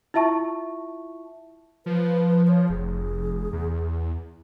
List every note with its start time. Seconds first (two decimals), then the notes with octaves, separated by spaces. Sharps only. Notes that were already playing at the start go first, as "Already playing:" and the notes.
0.14 E4 F4 E5 A5 C#6
1.86 F3 B4
2.48 C#5
2.69 F1 G#4
3.53 E2